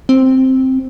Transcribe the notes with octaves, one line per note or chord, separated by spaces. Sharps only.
C4